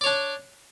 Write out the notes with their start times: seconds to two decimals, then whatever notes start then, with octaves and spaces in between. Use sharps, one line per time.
0.01 D5
0.04 C#5
0.06 D4